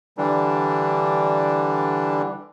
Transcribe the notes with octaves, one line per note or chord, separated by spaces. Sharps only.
D3 E3 G3 D4